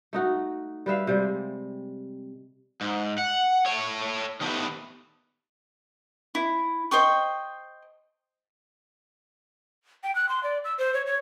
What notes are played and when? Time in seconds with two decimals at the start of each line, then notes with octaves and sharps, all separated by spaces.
0.13 A3 D#4 F#4
0.86 G3 B4 E5 F5
1.07 C3 G3 G#3
2.81 G#2
3.18 F#5
3.66 A3 C#5
4.41 D#3 F#3 A3 B3 G4 B4
6.35 E4
6.91 C5 D#5 G5 C#6
10.03 G5
10.15 F#6
10.29 C6
10.43 D5
10.65 E6
10.78 C5
10.94 C#5
11.06 C#5